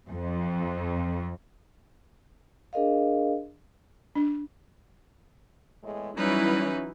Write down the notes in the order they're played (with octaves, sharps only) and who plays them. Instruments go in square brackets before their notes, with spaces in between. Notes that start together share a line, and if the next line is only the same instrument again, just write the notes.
[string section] F2
[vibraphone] D4 G#4 A#4 D#5 F5
[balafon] D4
[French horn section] E2 A2 G#3
[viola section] E3 F#3 E4 [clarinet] G3 [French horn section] C#4 [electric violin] D#4 B4